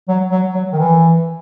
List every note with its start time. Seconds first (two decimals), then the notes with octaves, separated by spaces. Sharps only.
0.08 F#3
0.31 F#3
0.54 F#3
0.73 D#3
0.79 E3